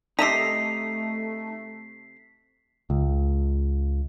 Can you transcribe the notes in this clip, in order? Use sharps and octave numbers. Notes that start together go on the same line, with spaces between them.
C3 A3 D#4 E5 A#5 B6 C7
C#2